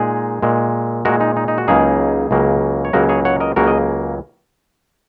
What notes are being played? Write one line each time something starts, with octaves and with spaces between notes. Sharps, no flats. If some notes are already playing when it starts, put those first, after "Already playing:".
Already playing: A#2 G#3 D#4 G#4
A#2 G#3
A#2 G#3 F#4 A#4
D#4
D#4
D#4
F#4
C#2 C#3 F#3 A#3 D#4 G#4
C#2 C#3 F#3 A#3
C#5
C#2 C#3 F#3 A#3 F#4 A#4
G#4 C#5
C#5 F#5
A#4 D#5
C#2 C#3 F#3 A#3 F#4 A#4
D#5